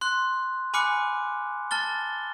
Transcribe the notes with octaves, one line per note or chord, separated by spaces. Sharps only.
C6 F#6
G#5 B5 D6 F6 F#6 C#7
A5 F6 A6 G7